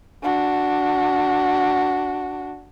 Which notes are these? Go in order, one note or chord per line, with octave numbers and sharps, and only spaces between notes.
D4 F#4